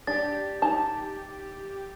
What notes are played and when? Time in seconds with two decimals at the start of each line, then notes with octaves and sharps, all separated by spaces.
0.07 D4 G4 A6
0.62 D#4 A5